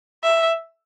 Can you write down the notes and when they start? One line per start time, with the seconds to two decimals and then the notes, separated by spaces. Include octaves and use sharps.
0.23 E5